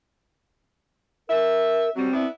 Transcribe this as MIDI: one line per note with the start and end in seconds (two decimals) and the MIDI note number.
1.29 1.90 70
1.29 1.89 76
1.96 2.12 54
1.96 2.12 55
1.96 2.26 60
2.13 2.27 59
2.13 2.27 62
2.13 2.27 64